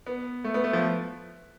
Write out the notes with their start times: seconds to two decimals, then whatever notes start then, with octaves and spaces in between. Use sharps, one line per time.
0.06 B3
0.44 A3
0.54 B3
0.64 A3
0.73 F3